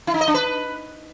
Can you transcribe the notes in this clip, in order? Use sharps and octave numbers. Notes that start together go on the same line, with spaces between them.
E4
D#4
D#5
D4
B4